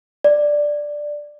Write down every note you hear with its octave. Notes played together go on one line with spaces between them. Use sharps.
D5